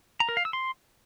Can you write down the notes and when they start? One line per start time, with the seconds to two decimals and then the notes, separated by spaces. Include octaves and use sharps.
0.20 A#5
0.29 A#4
0.37 F5
0.45 E6
0.53 C6